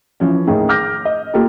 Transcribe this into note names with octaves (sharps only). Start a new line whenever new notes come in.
E3 F3 C#4
D#2 A2 D#3 G#4
D6 F6 G6 A#6
D#5
A#3 F4 G4 A4 A#4